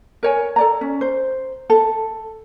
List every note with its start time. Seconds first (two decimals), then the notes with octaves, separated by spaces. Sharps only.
0.23 A#4 C#5 G#5
0.56 A4 D5 A#5
0.81 C#4
1.01 C5
1.70 A4